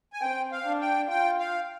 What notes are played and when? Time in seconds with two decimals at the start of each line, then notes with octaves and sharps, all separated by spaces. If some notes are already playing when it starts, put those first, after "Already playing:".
0.13 G#5
0.21 C4 G5
0.52 F5
0.66 D4
0.81 G5
1.10 F4 G5
1.39 F5